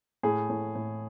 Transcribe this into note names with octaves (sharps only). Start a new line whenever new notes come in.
A2 G#4
A2
A2